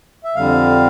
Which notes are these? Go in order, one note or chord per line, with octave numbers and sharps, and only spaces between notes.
E5
F2 D3 G3 F5